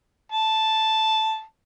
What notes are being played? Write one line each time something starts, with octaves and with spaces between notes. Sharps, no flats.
A5